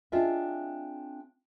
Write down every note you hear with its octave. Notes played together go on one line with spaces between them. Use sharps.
C4 D4 F4 G#4 D#5 E5